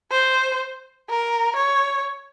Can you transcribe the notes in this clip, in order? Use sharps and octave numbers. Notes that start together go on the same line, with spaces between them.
C5
A#4
C#5